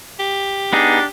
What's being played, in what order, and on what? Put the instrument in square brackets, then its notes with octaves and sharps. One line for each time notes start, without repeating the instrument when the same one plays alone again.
[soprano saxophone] G4
[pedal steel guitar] B3 D#4 G#4 [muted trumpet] D4